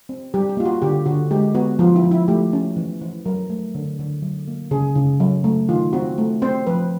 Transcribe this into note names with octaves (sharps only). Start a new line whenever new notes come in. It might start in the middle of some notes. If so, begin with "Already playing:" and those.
C4
G3 G4
G4
A#3 F4
F#4
D3 G4
D3 F#4
G#3 G4
B3 F#4
F3 F4
E4
F3
E4
A3 G4
C#4
E3
E3
F#3 A#4
A3
D3
D3
F#3
A#3
C#3 G#4
C#3
F#3
A3
D#3 F4
C4 F#4
A3
C4 C5
F3 B4